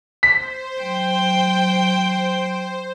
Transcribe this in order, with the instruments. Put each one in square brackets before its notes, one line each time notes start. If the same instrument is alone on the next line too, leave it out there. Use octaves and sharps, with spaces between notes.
[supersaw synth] C5 [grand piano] B6
[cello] F#3 G5